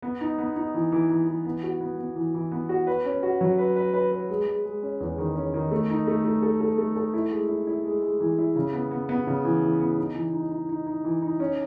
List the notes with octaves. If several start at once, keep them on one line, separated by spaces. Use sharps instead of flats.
B3
D#4
B3
D#4
E3
E3
E3
E3
B3
F#4
B3
B3
E3
E3
B3
F#4
B4
C#4
F#4
F#3
B4
B4
B4
B4
G#3
G#3
G#3
C#4
E2
D#3
C#4
D#3
A3
D#4
A3
A3
A4
A4
A3
A4
E4
G#3
E4
E4
G#3
G#3
E3
E4
C#3
B3
B3
B3
C#3
E3
E3
B3
D#4
E3
D#4
D#4
D#4
D#4
E3
D#4
C#4